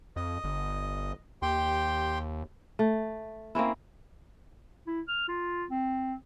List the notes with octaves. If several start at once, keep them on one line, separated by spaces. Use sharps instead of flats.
F2 D#5
G1
D#2 G4 G5 C6
A3
A#3 C4 C#4 E4
E4
F6
F4
C4